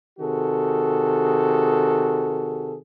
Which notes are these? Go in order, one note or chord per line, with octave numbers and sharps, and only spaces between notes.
C3 D#3 F#4 G#4 A4